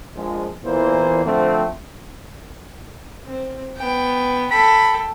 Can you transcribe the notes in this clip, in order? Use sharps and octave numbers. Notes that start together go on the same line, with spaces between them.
A#1 F3 G#3
E2 A#2 E3 A#3 C5
D3 F3 A3 C4
C4
B3 G5
A4 G5 B5